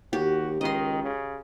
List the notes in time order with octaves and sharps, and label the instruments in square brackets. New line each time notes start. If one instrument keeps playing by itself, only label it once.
[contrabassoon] D#2 [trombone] F#4 [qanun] G4
[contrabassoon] C#2 [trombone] D#3 [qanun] D#5 C6
[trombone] C#3